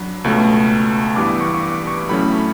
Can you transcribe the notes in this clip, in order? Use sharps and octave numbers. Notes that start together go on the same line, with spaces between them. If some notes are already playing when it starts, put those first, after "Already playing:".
Already playing: F#3 D4 B5
C#2 B2 A3 C#4
G2 E3 B3 D6
C#6
C#6
D6
C#6
A2 F#3 A3 C#4 B5